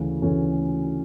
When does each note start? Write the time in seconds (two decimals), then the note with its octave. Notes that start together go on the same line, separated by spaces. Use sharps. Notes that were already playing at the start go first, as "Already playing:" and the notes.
Already playing: D2 C#3 E3 A3 C#4
0.22 D2 C#3 E3 A3 C#4